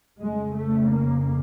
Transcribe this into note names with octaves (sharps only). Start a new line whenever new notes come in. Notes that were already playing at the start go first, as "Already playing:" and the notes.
F2 C#3 G#3
A3
A#3